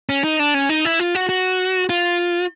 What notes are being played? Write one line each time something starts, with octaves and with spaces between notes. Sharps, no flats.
C#4
D#4
D4
C#4
D#4
E4
F4
F#4
F#4
F4